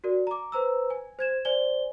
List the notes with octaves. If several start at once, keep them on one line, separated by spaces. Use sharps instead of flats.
F#4 A#4 D5
A#5 D6
B4 C5 A#5 E6
G#5
C5 G#6 E7
C5 D5 G#5 G7